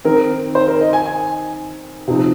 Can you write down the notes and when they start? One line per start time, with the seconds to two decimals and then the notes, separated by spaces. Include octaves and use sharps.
0.05 D#3 C4 D#4 A#4
0.55 C5
0.68 A#4
0.81 D#5
0.93 G#5
1.06 G#5
2.08 C3 F3 C4 D#4